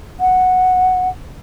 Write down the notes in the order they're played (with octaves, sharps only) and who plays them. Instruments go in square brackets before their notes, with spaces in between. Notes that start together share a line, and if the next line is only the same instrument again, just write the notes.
[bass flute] F#5